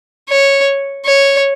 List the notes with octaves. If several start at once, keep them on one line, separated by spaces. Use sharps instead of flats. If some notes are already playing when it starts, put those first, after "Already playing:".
C#5
C#5